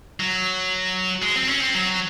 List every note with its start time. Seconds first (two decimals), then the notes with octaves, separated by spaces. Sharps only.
0.20 F#3
1.22 G#3
1.36 C4
1.49 C#4
1.61 C4
1.74 F#3